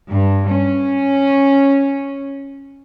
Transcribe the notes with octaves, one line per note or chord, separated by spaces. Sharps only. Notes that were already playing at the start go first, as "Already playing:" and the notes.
G2
C#4